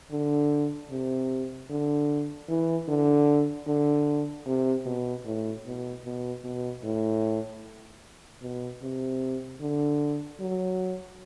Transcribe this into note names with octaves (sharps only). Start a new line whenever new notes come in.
D3
C3
D3
E3
D3
D3
C3
B2
A2
B2
B2
B2
A2
B2
C3
D3
F#3